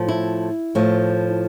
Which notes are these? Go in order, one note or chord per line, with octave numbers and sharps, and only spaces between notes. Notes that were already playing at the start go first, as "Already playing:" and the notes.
Already playing: A2 F3
E4
A2 F3